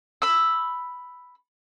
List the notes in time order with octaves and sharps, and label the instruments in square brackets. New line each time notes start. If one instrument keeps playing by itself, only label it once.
[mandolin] B5 E6